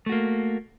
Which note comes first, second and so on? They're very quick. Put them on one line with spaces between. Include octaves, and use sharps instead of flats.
A3 F#4 A#3